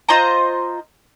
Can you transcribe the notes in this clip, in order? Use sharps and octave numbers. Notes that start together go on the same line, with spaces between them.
F4 C5 D#5 A#5